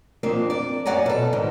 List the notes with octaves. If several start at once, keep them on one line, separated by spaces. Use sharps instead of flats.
F2 A#3 C4 D4
D5
F#2 D5 F#5 G#5 A#5
B2 A4
G#2 D#3